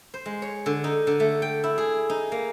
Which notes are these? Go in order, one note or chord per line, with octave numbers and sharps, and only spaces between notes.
C5
G#3
C#5
D3
D#4
D3
A3
G5
E4
G#4
D#4
A#3